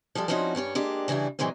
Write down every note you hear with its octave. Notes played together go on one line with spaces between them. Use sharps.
F3 G3 G#3 A4
F3 C4 C#4 D#4 E4 F#4
G2 G3 C#4 C#5
G#3 A#3 D4 G4
C#3 E3 G3 D4 E4
A#2 E3 F#3 G#3 A#3 C4